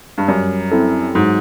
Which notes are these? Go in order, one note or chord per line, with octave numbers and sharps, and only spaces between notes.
G2
F#2 G3
C4 E4 A4
G#2 F#3